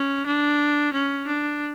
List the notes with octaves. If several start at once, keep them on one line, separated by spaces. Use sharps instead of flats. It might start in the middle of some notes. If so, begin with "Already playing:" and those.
Already playing: C#4
D4
C#4
D4